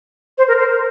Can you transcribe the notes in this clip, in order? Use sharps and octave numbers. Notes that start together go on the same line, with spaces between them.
C5
A#4
C5
A#4